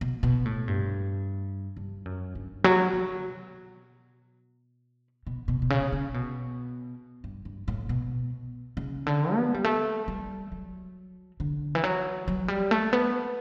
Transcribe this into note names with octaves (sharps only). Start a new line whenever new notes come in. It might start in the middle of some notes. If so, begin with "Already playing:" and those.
B2
B2
A2
G2
G2
F#2
G2
F#3
F#3
B2
B2
B2
B2
C#3
C#3
B2
G2
G2
A2
B2
C#3
D3
B3
G3
A3
G3
F#3
D3
E3
F#3
F#3
G3
A3
B3